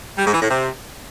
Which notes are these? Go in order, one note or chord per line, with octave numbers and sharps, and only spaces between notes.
G3
G#2
E3
A2
C3